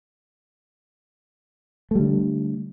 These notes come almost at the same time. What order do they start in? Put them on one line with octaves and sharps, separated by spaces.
A3 G3 D3